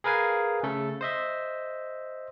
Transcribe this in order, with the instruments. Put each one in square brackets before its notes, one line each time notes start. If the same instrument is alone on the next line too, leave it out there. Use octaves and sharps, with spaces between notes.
[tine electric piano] G#4 A#4 B4 F5 G#5
C#3 A3 A4
C5 D#5 E5